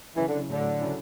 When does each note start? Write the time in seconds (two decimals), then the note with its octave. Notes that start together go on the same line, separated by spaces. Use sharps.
0.16 C#3 E3 F#3 C#4 E4
0.28 D3
0.49 A2 D3 F#3 A3
0.81 C#3 F#3 C#4 E4